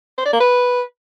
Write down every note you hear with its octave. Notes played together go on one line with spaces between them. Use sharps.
C5
D5
A#3
B4